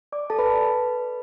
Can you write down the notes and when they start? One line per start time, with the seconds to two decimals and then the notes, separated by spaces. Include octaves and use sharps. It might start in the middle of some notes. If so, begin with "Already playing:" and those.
0.12 D5 D6
0.30 A4 A5
0.39 B4 B5